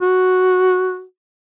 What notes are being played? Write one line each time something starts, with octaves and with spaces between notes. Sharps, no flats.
F#4